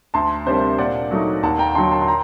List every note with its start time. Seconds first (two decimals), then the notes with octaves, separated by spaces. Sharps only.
0.14 D2 A5 C6
0.46 C3 G3 A#3 D4 C5
0.78 A#2 D5 F#5
1.11 F#3 A3 D#4
1.43 D#2 F#5 A5
1.59 G5 A#5
1.75 D3 F#3 A5 C6
1.92 A5 C6
2.02 C6
2.07 G5 A#5